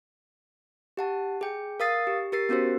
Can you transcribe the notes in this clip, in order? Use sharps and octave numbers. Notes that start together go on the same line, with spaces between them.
G4 F#5 A5
G#4 G5
A#4 F5 D#6 A6 C7
G4
G4 A#4 A6 C7
B3 C#4 F#4 A#4 C5